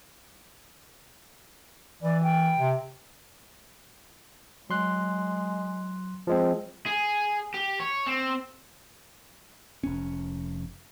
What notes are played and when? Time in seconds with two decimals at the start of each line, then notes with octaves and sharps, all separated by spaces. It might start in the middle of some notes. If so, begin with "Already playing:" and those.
2.03 E3 D5
2.23 G5
2.58 C3
4.70 F#3 G#3 C6 F#6
6.27 F3 G#3 C4
6.86 G#4
7.54 G4
7.80 C#5
8.06 C4
9.83 F1 C#4